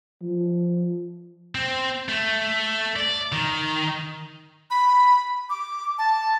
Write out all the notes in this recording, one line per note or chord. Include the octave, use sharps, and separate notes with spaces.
F3
C4
A3
D5
D#3
B5
D6
A5